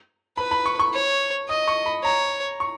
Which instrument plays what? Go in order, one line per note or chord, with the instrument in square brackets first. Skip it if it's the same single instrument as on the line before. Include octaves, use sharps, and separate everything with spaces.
[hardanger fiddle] B4 [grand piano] B5
[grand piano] B5
C#6
C#6
[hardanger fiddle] C#5
[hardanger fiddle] D#5 [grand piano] D#6
[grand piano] C#6
B5
[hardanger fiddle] C#5 [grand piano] A#5
[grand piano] C#6